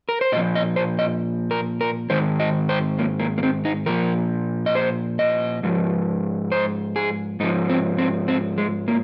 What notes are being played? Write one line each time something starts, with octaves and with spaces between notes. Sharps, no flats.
A#4
C5
A#2 F3 D#5
D#5
C5
D#5
A#4
A#4
G#2 D#3 C5
D#5
C5
A#3
A#3
A#3
C4
D#4
A#2 F3 A#4
D#5
C5
D#5
G#2 F3
C5
G#4
G#2 F3 D#4
C4
C4
C4
G#3
A#3